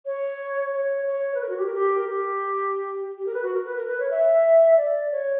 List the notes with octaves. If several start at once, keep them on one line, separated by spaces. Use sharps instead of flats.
C#5
C#5
C#5
B4
A#4
F#4
G4
A#4
G4
A#4
G4
G4
A#4
B4
F#4
A#4
B4
A#4
B4
C#5
E5
D5
C#5